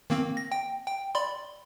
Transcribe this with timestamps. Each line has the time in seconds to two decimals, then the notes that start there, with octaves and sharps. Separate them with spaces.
0.10 D#3 A#3 C4
0.37 A#6
0.52 G5
0.87 G5
1.15 D5 B5 C6